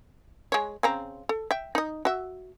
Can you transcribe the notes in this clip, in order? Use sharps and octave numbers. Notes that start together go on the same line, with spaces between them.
G#3 C#5
C#3 C4 A#5
A4
E5 G5
D#4 D#5
F#4 E5